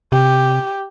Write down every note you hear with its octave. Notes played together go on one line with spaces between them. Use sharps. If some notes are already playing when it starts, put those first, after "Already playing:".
C3 G4